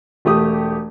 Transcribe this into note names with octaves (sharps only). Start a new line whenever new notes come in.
E1 A3 G4 D#6